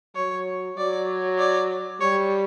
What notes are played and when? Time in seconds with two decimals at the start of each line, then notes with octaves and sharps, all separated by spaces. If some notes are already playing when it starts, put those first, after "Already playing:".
0.16 F#3 C#5
0.77 F#3 D5
1.39 D5
2.00 G3 C#5